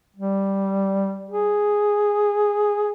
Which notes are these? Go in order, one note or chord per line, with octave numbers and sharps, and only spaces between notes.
G3
G#4